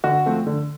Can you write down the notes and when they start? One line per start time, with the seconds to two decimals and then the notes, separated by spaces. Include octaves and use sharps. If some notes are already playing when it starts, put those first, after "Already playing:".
0.04 D3 F#4
0.26 F3 A3 C4
0.47 D3